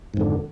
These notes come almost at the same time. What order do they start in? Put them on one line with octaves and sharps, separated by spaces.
G#2 F2 D3